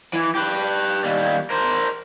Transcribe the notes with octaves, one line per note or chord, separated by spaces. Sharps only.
E3
G4 B4
D#2 G3
A#4 C5